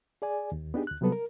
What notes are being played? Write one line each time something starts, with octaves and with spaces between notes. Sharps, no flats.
G#4 D5 G#5
D#2
B3 D4 D#4 G4 G#4
D2 F#6
C3 F#3 G3 B3 A4 B4
A#4